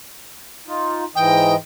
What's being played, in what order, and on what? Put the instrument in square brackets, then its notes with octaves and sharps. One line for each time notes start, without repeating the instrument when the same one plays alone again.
[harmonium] D#4 F4
[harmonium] G#2 E3 D#5 [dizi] G5